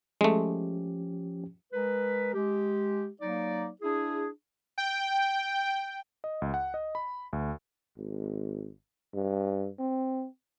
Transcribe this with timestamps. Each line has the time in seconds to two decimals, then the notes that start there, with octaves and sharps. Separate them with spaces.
0.21 F3 G#3 A3 C#4 G4
1.73 G#3 A#4 B4
2.33 G#3 G4
3.21 F#3 A#3 D#4 D5
3.82 D4 E4 G#4
4.78 G5
6.24 D#5
6.42 C#2
6.54 F#5
6.74 D#5
6.95 B5
7.33 D2
7.98 G#1
9.15 G2
9.79 C4